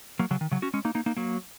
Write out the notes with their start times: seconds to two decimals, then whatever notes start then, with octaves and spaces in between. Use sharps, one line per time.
0.19 F#3 A#3
0.31 C#3 F#3
0.41 D#3
0.51 C#3 F#3
0.62 C#4 F#4
0.74 G#3 C#4
0.85 A#3 D#4
0.95 A#3 D#4
1.06 A#3 D#4
1.17 F#3 A#3